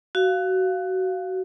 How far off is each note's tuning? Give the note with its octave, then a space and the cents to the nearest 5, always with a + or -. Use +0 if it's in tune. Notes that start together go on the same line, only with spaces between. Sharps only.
F#4 +20 F5 +0